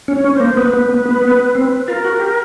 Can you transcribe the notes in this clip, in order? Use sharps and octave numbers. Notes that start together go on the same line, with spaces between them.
C#4
C#5
C#4
C5
A#3
B3 B4
B3
B3
B3
B3
C4
F4 B4
A#4
F#4
G4